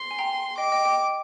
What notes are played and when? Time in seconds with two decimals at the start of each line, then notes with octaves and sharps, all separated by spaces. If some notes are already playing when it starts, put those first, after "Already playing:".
Already playing: C6
0.11 G#5
0.19 G5 A#5
0.58 D#5 G5 D6
0.72 D#5 G5
0.85 D#5 G5